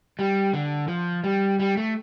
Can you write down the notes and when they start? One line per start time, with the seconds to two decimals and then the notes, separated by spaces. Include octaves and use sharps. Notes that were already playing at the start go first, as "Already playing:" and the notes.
0.19 G3
0.53 D3
0.88 F3
1.24 G3
1.59 G3
1.77 A3